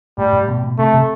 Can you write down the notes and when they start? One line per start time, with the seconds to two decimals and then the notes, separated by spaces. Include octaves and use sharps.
0.18 A2 G3
0.33 A2
0.48 B2
0.64 B2
0.78 C3 A3
0.94 C3